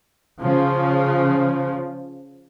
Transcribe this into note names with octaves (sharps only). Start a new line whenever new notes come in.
C#3 F3